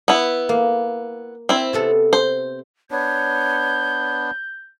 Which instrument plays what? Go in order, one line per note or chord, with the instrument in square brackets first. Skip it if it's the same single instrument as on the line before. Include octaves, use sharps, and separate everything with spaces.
[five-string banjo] B3 E4
[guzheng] A#3
[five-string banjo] C4 E4
[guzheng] C3 B3 A4
[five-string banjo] C5
[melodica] B3 D4 [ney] C#5 [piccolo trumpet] G6